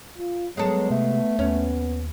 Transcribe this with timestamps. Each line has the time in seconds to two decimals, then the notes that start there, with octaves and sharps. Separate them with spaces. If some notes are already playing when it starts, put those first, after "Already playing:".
0.18 F4
0.57 F#3 G#3 B3 A4
0.90 C3 A3
1.39 D#2 B3 C#4